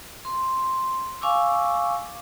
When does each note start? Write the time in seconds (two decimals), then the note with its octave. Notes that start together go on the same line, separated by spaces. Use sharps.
0.25 C6
1.21 F5 G#5 C#6 D6 E6